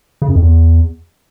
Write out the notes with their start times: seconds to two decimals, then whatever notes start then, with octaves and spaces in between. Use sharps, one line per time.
0.22 C#3
0.29 F#2
0.36 F2
0.43 E2